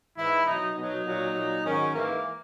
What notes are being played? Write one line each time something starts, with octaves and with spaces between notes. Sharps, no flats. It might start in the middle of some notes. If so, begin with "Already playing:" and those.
G#2 E3 E4
B2 F#3 D#4
B2 F#3 D#4
A#2 F#3
A#2 F#3
G#2 D#3 F#3 C#4
G#2 E3 A#3